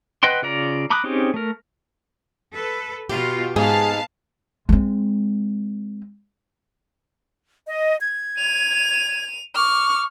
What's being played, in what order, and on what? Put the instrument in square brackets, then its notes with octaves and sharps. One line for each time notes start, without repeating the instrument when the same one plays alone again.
[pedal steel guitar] B4 D#5 F#5 G5 C6
C#3 F4 D5 A#5
A#5 B5 D6 D#6 F#6
C4 C#4 D#4 G4 G#4
A3 A#4
[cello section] A4 B4
[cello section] B2 F4 [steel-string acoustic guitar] G4
[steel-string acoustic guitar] G#2 G#3 [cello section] B3 [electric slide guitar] G#4 [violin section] F5 A5
[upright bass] G#3 C4
[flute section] D#5
G#6
[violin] D#7 F7
[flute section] C#6 D6 [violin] F6